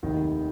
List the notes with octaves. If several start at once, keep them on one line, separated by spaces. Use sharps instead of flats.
F1 D#2 D#3